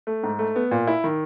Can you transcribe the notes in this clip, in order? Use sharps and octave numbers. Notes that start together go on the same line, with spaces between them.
A3
G#2
A3
B3
A#2
E4
D#3